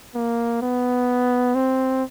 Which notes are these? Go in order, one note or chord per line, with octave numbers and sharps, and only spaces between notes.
A#3
B3
C4